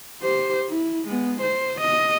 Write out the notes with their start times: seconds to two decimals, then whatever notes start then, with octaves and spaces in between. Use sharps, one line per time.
0.23 G4 C5
0.70 E4
1.08 G#3 B3
1.41 C5
1.80 D#5